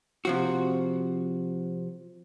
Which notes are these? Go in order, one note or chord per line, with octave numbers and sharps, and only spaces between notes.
C3 F3 F#4